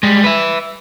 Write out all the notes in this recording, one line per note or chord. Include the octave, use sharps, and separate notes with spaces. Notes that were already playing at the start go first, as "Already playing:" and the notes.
G3 G#3
B4 E5